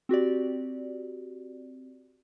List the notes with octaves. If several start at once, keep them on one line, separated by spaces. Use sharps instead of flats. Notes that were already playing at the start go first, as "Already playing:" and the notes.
C4 F#4 G4 D5